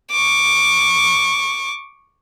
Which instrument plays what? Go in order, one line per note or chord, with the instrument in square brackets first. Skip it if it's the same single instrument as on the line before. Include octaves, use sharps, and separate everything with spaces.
[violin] C#6 D6